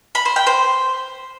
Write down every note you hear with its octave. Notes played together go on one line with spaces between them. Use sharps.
B5
C5
G5
C5